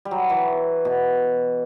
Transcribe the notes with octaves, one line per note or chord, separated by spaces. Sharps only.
G3
F#3
E3
B2